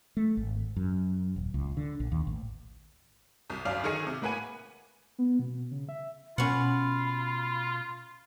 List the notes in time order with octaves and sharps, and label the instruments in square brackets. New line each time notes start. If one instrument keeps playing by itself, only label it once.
[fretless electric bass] A3
G#1
F#2
D#1
C#2
D3
A#1
D#2
A1
[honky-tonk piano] C2
G1 F#2 D5 F5 F6 F7
D3 D#3 D#4 G#4 C#7 D#7
C3
A2 A#3 B4 F#5 G#5 D#7
[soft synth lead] B3
B2
C#3
E5
[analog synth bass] B2 [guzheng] C#4 F#5 [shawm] F4 [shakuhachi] B5